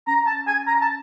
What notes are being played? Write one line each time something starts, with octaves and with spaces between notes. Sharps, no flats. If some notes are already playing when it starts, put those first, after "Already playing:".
C#4 A#5
A5
G#5
A#5
A5